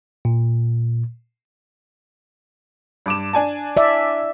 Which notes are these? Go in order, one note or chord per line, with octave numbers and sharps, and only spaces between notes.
A#2
G2 D6 E7
D4 G#5 A5
D5 E5